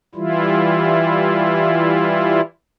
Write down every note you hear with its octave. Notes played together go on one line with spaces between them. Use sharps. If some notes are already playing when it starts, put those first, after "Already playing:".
E3 G3 E4 F4